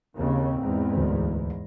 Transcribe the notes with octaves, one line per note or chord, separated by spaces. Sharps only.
D#2 C#3 C4
E2 G#2
D2